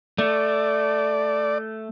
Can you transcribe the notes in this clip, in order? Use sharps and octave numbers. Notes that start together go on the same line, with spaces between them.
A3 D5